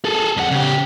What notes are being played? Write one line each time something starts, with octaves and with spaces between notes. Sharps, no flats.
G#4 A4
F2 F#5
C#3 G4